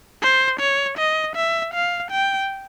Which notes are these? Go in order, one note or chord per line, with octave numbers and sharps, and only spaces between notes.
C5
C#5
D#5
E5
F5
G5